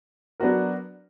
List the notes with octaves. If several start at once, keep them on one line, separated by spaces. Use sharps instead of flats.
F#3 B3 D4 F#4 A#4